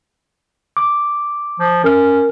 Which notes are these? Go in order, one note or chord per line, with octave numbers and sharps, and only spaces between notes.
D6
F3
C#4 A#4 F6